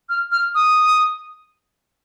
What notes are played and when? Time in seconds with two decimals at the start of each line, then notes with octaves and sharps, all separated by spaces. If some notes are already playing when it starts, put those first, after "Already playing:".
0.09 F6
0.32 F6
0.55 D#6